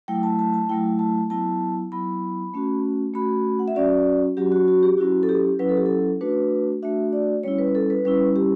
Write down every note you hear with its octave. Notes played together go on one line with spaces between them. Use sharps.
F#3 A3 E4 G5
A5
A5
A5
F#3 A3 E4 G5
A5
F#3 B3 E4 A5
F#3 B3 E4 B5
A3 C#4 F#4
A3 C#4 F#4 B5
F#5
E5
F#3 C#4 F#4 D5
F#3 C#4 F#4 G4
F#4
F#4
G4
F#3 C#4 E4 F#4
A4
G4
F#3 C#4 E4 B4
A4
G4
A4
A3 D4 F#4 B4
A3 D4 F#4 E5
D5
G3 C#4 E4 C#5
B4
A4
B4
G3 C#4 E4 B4
G4